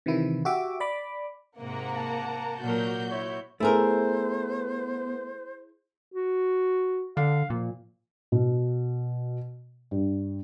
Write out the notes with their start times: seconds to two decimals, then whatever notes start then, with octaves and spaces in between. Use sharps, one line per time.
0.06 C3 D#3 E3 E4
0.45 F#4 G4 E5 D6
0.80 D5 B5 D6
1.58 G#2 C3 A#3 F#5 A#5
1.97 A5
2.62 A#2 F#3 F#4 A#4 G6
3.11 E4 C#5
3.60 A3 B3 E4 G#4 A#4 C5
6.14 F#4
7.17 D3 F5
7.50 A#2 F3
8.32 B2
9.91 G2